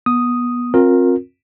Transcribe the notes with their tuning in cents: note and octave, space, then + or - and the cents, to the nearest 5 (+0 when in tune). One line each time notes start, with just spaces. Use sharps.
B3 -25 D#6 +0
C4 +30 F4 +35 A#4 +0